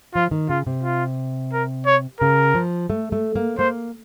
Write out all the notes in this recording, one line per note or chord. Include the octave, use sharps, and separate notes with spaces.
F3 F4
D#3
C#3 F4
C3
F4
A#4
C#5
C#3 A#4
F3
A3
A3
A#3
A#3 C5